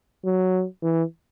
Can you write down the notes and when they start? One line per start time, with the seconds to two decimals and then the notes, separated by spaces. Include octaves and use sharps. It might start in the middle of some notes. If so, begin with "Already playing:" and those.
0.24 F#3
0.82 E3